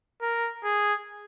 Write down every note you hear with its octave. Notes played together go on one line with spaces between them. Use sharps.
A#4
G#4